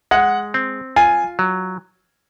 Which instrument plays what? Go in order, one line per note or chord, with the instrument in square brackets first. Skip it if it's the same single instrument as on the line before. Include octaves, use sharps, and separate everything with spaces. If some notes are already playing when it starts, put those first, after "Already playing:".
[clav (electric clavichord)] G#3 [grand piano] F#5
[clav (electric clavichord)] C4
[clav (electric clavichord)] F4 [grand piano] G#5
[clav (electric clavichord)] F#3